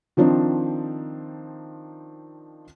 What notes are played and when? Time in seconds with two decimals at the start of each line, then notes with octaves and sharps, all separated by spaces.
0.17 D#3 F3 C4 D4 D#4